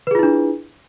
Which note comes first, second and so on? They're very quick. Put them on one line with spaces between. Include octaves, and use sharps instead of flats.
B4 G#4 F4 E4 D4